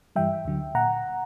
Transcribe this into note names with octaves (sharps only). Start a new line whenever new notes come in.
G2 E3 G3 E5 G5
D2 D3 F#3
A#2 F#5 A#5